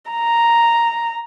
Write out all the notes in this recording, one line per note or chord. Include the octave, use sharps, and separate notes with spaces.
A#5